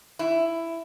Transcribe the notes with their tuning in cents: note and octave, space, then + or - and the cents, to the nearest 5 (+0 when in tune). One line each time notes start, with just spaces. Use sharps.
E4 +10